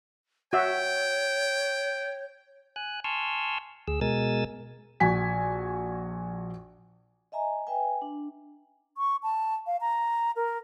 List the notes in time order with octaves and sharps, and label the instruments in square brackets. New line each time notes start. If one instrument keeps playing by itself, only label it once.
[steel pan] F#4 E5 [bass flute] C#5 [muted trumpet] G5
[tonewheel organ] G#5 F#6
G#5 A5 C6 C#6 E6 F6
D2 G#4 E6
B2 G#3 A#4 G#5 E6 A6
[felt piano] A#1 F#4 G#5 B6
[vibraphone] D#5 E5 G#5 A#5
B4 E5 G5 G#5
D4
[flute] C#6
A5
F5
A#5
A#4